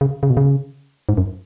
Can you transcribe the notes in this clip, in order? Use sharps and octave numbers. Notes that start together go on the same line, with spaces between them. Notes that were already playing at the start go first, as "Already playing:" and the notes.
C#3
C#3
B2
C#3
G#2
F#2